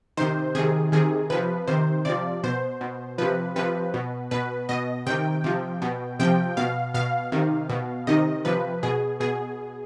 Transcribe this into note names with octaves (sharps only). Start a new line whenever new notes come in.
C3 D#3 C5
C3 D#3 G#4
C3 D#3 G#4
C3 F3 B4
C3 D#3 C5
C3 F3 D5
B2 C5
B2
C3 F3 B4
C3 F3 B4
B2
B2 B4
B2 D#5
C3 D#3 G5
C3 F3
B2
C3 F3 G5
B2 F5
B2 F5
C3 D#3
B2
C3 D#3 D#5
C3 F3 B4
B2 G#4
B2 G#4